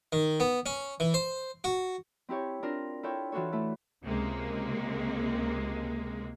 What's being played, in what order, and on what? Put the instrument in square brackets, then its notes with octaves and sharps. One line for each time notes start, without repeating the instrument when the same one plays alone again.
[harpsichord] D#3
B3
C#4
E3
C5
F#4
[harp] C4 E4 G4 C#5
C4 D4 F4 A#4
E4 F4 A4 C#5 G5
E3 D4 F4 F#4 A4 C#5
A3 E4 A4
[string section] C#2 C3 G#3 A#3